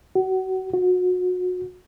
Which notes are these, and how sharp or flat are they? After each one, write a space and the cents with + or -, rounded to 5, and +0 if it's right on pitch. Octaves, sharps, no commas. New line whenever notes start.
F#4 +30
F#4 -30